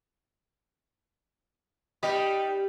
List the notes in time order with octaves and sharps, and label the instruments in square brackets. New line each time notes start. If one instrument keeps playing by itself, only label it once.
[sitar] G3 [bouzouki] D#4 G4 B4